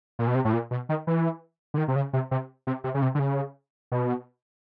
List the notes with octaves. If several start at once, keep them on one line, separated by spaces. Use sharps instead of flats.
A#2
B2
C3
A2
A#2
B2
D#3
E3
D3
D#3
C3
C#3
C3
C3
C3
C3
C#3
C3
D3
C#3
B2